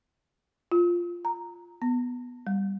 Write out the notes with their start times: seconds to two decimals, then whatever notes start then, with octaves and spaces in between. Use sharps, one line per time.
0.72 F4
1.25 A#5
1.82 B3
2.47 G3